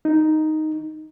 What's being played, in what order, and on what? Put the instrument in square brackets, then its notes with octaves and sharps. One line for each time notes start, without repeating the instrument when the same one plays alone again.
[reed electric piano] D#4